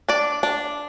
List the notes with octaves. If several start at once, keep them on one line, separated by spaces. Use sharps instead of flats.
D4 D5
D4